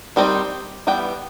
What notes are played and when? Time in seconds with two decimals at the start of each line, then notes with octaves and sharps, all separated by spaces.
0.16 D#3 G3 C4 D#4
0.87 E3 G3 B3 G5